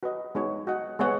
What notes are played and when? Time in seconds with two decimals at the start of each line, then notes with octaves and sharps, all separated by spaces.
0.03 F#4 B4 D#5
0.35 G#3 B3 D#4 F#4 C#5
0.67 F#4 D#5 F#5
0.99 G#3 B3 G#4 C#5 F#5